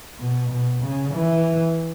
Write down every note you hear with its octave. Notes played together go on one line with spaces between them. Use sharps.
B2
B2
C#3
E3